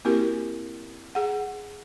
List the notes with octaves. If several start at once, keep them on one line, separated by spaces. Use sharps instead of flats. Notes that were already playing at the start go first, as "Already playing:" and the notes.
A#3 C4 E4 F#4 G4 A#4
G#4 F#5